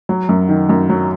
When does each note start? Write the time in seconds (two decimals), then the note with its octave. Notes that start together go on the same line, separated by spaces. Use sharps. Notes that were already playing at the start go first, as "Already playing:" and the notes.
0.09 F#3
0.29 F#2
0.49 D#3
0.69 F#2
0.90 F#3